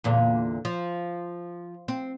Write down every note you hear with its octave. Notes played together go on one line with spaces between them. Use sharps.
E2 A#2 D3
F3
C4